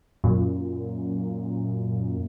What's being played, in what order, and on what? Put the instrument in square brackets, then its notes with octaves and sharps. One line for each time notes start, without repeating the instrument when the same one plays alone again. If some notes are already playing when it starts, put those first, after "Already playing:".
[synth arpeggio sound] F#2 A#2